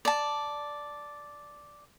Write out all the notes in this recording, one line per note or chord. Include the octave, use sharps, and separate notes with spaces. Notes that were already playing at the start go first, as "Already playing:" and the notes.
D5 A5